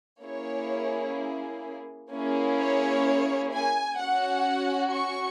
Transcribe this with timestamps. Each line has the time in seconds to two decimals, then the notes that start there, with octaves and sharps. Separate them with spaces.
0.24 A#3 C#4 E4 G#4 C#5
2.11 A#3 C#4 E4 G#4
2.59 C#5
3.53 G#5
3.99 C#4 F#4 F#5
4.94 C#6